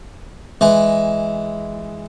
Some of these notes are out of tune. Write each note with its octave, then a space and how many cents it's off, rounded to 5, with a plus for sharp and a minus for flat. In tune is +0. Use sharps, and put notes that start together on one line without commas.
E3 +0 G#3 +0